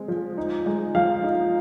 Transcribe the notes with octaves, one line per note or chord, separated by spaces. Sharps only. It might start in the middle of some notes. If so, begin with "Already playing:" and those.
Already playing: G#3 C4
F3
D#4
G#3
F3 F5
D#4